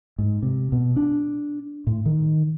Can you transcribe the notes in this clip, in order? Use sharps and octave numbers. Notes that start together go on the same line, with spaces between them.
G#2
C3
B2
D4
A2
D#3